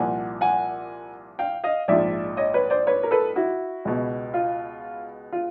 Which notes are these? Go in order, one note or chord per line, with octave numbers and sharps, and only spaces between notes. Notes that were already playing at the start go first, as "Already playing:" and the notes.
Already playing: C2 A#2 F3 F#5 G#5
F#5 G#5
F5 G5
D#5 F5
A#1 G#2 F3 D5 E5
C#5 D#5
B4 C#5
C5 D5
B4 C#5
A#4
A4 B4
E4 F#4
C#2 B2
F4
F4